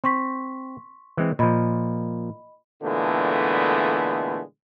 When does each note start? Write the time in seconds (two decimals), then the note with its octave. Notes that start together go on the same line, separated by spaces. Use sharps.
0.04 C4 C6 C#6 B6
1.17 E3 G#3 C4
1.39 A#2 F3 D#5 B5
2.82 A#2 D3 E3 G#3 A3 B3